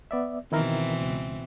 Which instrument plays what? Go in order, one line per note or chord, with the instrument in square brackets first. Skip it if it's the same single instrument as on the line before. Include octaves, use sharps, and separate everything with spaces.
[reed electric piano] B3 D5 E5
[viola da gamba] B2 E3 C4 [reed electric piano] D#3 E4 A#4
[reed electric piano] C#2